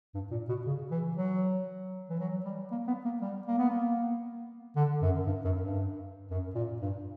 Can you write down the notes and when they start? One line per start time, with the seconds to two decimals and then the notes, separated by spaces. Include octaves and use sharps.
0.14 G2
0.31 A#2
0.49 B2
0.66 C#3
0.91 E3
1.17 F#3
2.10 E3
2.20 F#3
2.45 G3
2.72 A#3
2.87 B3
3.05 A#3
3.22 G3
3.47 A#3
3.58 B3
3.69 A#3
4.76 D3
5.02 F#2
5.27 G2
5.45 F#2
5.62 G2
6.31 F#2
6.55 A#2
6.81 G2